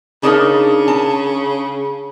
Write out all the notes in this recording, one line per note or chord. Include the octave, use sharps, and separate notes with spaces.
C#3 D4 D#4 A#4
A5